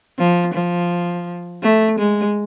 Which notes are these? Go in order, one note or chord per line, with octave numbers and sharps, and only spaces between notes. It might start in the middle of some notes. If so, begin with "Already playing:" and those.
F3
F3
A3
G#3